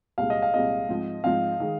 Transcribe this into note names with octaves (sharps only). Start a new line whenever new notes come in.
C2 A#2 G#3 C4 F5
D#5
F5
C2 A#2 G#3 C4 D#5
G#2 F3 C4
G#2 F3 C4 F5
D#3 G#3